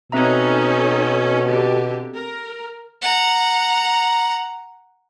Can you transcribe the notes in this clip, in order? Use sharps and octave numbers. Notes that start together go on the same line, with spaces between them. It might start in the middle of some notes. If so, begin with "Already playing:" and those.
B2 C4 C#4 D#4 A4 E5 A#5
D3 G4
A#4
F#5 A#5